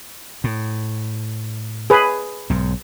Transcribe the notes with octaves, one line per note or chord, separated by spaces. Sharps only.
A2
G#4 B4
B1 G#2